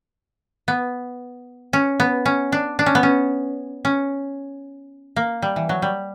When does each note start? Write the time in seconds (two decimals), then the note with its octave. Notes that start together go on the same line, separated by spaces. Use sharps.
0.68 B3
1.73 C#4
2.00 B3
2.26 C#4
2.52 D4
2.79 D4
2.86 C#4
2.95 B3
3.03 C#4
3.85 C#4
5.16 A#3
5.42 G3
5.56 E3
5.69 F#3
5.82 G3